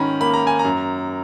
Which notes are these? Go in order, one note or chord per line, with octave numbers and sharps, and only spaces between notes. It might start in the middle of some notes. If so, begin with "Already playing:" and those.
Already playing: G#2 D#3 C#4 A#5 B5
A#3 B5
A#5
G#5
A#5
F#2